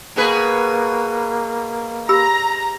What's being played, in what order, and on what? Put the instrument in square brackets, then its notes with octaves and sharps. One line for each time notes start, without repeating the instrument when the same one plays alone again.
[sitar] B2 G#4 B4 [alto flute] A#3
[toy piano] G4 B5 E6 [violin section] A#5